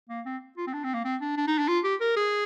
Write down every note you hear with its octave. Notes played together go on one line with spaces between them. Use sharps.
A#3
C4
F4
C4
D4
C4
A#3
C4
D4
D4
D#4
D4
F4
G4
A#4
G#4